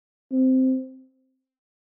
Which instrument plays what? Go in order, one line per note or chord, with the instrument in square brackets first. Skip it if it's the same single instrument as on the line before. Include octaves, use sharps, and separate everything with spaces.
[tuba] C4